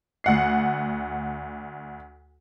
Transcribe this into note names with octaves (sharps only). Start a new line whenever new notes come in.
D2 F#5 C7